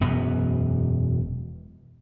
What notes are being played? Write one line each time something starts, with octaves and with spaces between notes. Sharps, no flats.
E1 F#2 B3